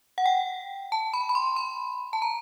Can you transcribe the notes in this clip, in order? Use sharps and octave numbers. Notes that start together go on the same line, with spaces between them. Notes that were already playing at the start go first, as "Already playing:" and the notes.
F#5
G5
A5
B5
B5
C6
B5
A5
A#5